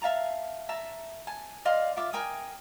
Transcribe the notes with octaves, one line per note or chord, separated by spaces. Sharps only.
E5 F5 A5 A#5
E5 A5 A#5
G#5 A5
D5 D#5 F5 C6
F4 E5 D6
A#4 G5 G#5 D#6